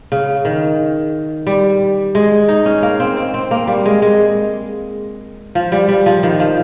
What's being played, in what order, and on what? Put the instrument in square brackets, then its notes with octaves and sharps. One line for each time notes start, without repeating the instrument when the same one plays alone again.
[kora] C#3
D#3
G3
G#3
D#4
C#4
A#3
C4
C4
C4
A#3
G3
G#3
G#3
F3
G3
G3
F3
D#3
F3